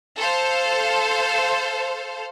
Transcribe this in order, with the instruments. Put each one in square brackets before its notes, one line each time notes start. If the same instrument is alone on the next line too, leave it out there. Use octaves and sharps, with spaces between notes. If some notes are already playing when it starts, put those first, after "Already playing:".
[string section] A4 C5 F5